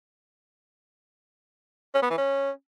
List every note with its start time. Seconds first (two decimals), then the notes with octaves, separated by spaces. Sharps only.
1.95 C#4
2.02 B3
2.10 E3
2.18 C#4